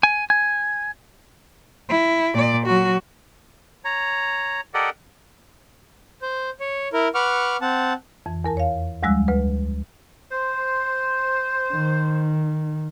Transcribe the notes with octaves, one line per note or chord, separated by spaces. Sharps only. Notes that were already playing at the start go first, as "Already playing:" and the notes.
G#5
G#5
E4
A#2 D5
F#3 F#4
C#5 A#5
G4 A4 A#4 D5 D#5 F#5
C5
C#5
E4 A#4
B4 F#5 C#6 D6 F6
C4 F#5 A5
F2 E3
E2 A#4 A5
C#5 F5
D2 F3 G3 G#3 E6 F#6
D2 B4
C5
D#3